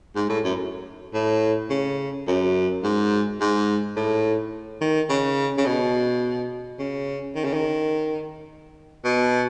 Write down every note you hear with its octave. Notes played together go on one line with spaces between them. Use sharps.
G#2
A2
F#2
A2
C#3
F#2
G#2
G#2
A2
D#3
C#3
C#3
B2
C#3
D#3
C#3
D#3
B2